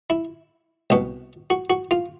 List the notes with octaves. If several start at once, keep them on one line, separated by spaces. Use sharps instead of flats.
E4
C2 B2
F#4
F#4
F4